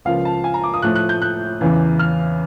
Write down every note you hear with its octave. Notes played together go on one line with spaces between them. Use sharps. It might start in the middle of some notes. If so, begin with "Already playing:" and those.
C#2 C#3 F3 A#3 F5
A5
G#5
A#5
D6
D#6
A2 F3 A3 F#6
F#6
G6
F#6
E2 C#3 E3
F6